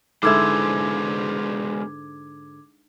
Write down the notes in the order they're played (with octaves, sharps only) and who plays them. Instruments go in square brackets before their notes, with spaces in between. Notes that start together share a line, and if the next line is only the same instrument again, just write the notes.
[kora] G#2 D3 E4 [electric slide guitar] G#3 B3 C5 [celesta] D6 G#6